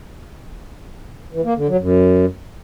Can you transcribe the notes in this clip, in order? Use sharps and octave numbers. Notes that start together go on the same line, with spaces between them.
E3
A#3
D3
F#3
F#2